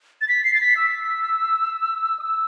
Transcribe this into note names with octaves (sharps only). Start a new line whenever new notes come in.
A6
B6
C7
A6
B6
E6
D#6
E6